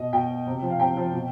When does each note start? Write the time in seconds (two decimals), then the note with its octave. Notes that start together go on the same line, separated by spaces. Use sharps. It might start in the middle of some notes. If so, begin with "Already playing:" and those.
Already playing: B2 D#5
0.13 B2 G5
0.47 C3
0.62 F3
0.70 F5
0.79 C3 G5
0.97 F3
1.13 B2